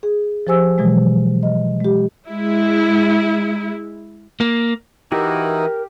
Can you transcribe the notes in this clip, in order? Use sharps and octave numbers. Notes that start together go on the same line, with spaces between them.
G#4
F3 G4 C5 G#5 E6
B2 E3 F#3 G#3
D#5
G#3 G4
G#3 E4
A#3
E3 D#4 E4 F#4 G4 A#4